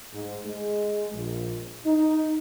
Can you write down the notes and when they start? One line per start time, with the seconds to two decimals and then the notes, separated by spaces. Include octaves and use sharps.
0.14 G#2
0.46 G#3
1.14 A#1
1.86 D#4